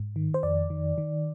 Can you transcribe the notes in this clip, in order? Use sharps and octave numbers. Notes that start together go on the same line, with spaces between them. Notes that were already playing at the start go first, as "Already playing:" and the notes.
Already playing: G#2
D#3
C5
F2 D5
D#3
D#3